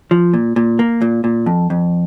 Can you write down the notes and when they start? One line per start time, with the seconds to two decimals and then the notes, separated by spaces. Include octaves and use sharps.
0.11 F3
0.34 A#2
0.56 A#2
0.79 A#3
1.02 A#2
1.24 A#2
1.46 F2
1.70 F2